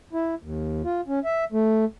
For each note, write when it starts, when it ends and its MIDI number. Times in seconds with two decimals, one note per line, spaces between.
0.13 0.35 64
0.42 0.82 39
0.84 1.01 65
1.08 1.19 61
1.24 1.44 76
1.52 1.85 57